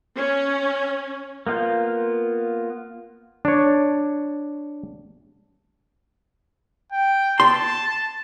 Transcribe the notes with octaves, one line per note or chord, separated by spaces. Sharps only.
C#4
A#3 B3 F4 F5 G6
D4 C#5
G5
A5 C6